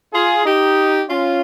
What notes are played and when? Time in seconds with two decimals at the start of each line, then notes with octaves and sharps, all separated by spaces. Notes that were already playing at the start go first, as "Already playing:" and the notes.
0.13 F4 G#4
0.45 D#4 G4
1.09 C#4 F4